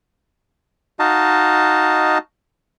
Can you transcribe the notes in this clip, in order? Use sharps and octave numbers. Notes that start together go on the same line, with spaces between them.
D#4 F#4 D#5 F5 A5